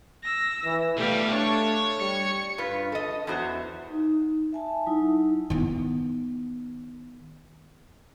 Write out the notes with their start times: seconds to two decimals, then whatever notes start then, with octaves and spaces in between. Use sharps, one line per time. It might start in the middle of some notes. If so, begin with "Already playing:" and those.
0.23 E6 A#6
0.65 E3
0.98 B1 G3 A3 G4 F5
1.32 D4 C#5
2.00 G3 C#7
2.58 G2 F4 B4
2.92 A4 D#5
3.27 E2 E3 F#4 C5
3.90 D#4
4.53 E5 G#5 A5
4.86 F#3 D#4 E4
5.50 D#3 B3